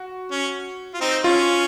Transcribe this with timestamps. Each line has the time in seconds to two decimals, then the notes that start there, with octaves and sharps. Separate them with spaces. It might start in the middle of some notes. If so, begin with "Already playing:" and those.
Already playing: F#4
0.31 C#4
0.94 F4
1.01 C4 D#4
1.24 C#4 F4